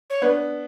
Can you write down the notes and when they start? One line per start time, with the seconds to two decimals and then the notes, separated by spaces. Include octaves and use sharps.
0.10 C#5
0.21 B3 D4 B4